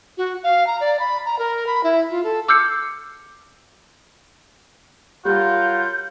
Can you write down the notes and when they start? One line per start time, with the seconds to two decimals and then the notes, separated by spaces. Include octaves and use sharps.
0.18 F#4
0.43 F5
0.67 A#5
0.81 D5
1.00 B5
1.26 A#5
1.39 A#4
1.67 B5
1.84 E4
2.10 F4
2.24 A4
2.48 D6 E6 F6 G6 C7 C#7
5.25 F#3 G3 F4 A#4 F#5 G6